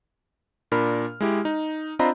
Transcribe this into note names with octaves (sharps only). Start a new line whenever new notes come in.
A#2 D4 A#4 B5 F6
G#3 E4 G4
D#4
C4 D4 F4 D#5 A#5 B5